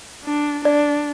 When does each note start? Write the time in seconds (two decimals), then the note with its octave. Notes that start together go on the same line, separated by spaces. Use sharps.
0.24 D4
0.65 D4 D5